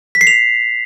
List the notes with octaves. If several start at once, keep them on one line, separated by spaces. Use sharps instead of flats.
B6
C7
F7